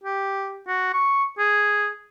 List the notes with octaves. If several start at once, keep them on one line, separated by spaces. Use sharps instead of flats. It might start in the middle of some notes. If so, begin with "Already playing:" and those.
G4
F#4
C#6
G#4